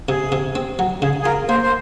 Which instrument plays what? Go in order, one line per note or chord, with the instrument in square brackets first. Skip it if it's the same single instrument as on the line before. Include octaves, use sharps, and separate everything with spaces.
[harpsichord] C3 [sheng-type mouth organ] G#4
[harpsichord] C3
C4
F#3
[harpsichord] C#3 [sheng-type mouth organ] G#4
[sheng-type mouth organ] G#4
[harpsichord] F4 [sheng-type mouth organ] A#4
[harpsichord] A#3 [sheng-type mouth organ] C5
[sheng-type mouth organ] C5